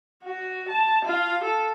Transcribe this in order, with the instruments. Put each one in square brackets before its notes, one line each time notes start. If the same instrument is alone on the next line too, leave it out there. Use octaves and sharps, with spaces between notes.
[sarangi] F#4
A5
F4
A4